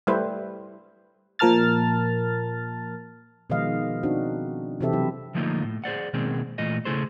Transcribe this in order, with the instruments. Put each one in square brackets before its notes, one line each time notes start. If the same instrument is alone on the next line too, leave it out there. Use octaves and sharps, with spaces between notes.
[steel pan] G3 A3 E4 G4 B4 C5
[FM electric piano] A#2 F3 A#4 A5 F6 A6
[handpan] B2 D#3 F3 G#3 D#5 F5
C4 D4 D#4 F#4
C3 E3 C4 G4 A4 E5
F#3 E4
[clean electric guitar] D3 F3 A3 A#3 D#4 F4
A2
G#4 C5 D5 F#5
B2 D#3 G#3 A#3 C4 G#4
A#2 E3 A3 F4 D#5
C#3 A3 E4 G#4 A4 C5